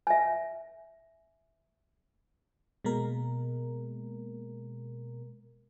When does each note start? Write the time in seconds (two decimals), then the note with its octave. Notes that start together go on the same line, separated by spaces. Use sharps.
0.07 E5 G#5
2.85 B2 G#3 A#3 A#4